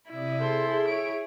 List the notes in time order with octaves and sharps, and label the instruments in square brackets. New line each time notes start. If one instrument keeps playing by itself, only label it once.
[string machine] C3 D5 D#6 [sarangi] E4
[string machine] G#4 [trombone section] A4 [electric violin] C5 C6
[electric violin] C#5 D7